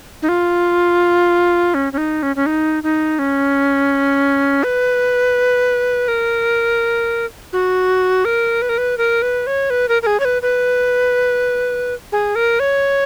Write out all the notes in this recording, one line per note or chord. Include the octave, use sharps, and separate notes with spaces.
D#4
F4
C#4
C#4
D#4
C#4
C#4
D#4
D#4
C#4
B4
A#4
F#4
A#4
B4
A#4
B4
A#4
B4
C#5
B4
A#4
A#4
G#4
C#5
B4
B4
G#4
A#4
C#5